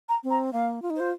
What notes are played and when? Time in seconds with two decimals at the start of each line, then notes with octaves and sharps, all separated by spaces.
0.09 A#5
0.24 C4
0.30 A#5
0.53 A#3 F5
0.82 F4
0.90 D#4
0.96 F4 C5